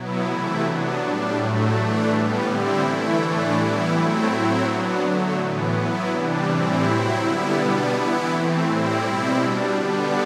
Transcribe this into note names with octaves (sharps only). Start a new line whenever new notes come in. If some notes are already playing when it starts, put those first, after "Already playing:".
Already playing: B2 F#3 B3 E4
C3 E3 A3 E4
F#3 B3 D4
A2 G3 D4
A2 F#3 A3
E3 A3 D4
A2 G3 B3
D3 G3 C4 E4
E3 A3 E4
A2 E3 A3 D4
E3 G3 B3 E4
F#3 A3 C4 E4
A2 F#3 C4 E4
F#3 B3 D4
D3 F#3 A3
A2 E3 B3
F#3 B3 E4
C3 E3 G3 D4
A2 E3 G3 C4 E4
F#3 C4 E4
D3 G3 B3 E4
B2 G3 B3 D4
E3 B3 E4
E3 A3 C4
A2 G3 C4 E4
B2 G3 C4 E4
B2 G3 D4
D3 G3 B3 D4